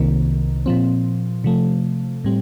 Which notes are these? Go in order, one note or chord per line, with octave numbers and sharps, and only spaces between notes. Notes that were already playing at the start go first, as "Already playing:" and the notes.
Already playing: C2 C3 D#3 A#3
A#2 F3 C4
C3 F3 A3
A2 G3 C4